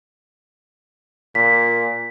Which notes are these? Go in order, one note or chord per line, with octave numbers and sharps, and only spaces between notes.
A#2 B6